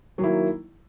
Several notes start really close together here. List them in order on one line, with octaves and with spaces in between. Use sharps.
F#3 D#3 E4 A#3